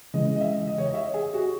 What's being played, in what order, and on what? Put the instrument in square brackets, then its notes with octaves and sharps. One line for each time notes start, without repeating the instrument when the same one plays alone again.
[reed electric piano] C#3 E3 G#3 [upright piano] D#5
[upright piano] D#5
E5
D#5
C#5
D#5
E5
G#4
F#4